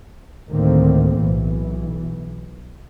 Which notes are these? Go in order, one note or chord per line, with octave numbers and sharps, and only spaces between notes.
D2 A2 D3 D#3 A#3 C4
B1 E3